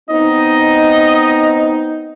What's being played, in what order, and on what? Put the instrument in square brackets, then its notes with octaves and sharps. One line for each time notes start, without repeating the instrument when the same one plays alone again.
[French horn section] B3 C4 D#4 [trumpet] D#5